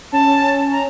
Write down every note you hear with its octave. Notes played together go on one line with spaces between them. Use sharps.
C#4 A5
A#5